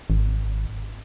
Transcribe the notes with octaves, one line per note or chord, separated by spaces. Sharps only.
G#1